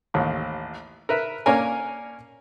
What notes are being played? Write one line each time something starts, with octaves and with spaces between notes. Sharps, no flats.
A1 D#2
A#4 B4 E5
A#3 C#4 D4 A#4 C#5 G#5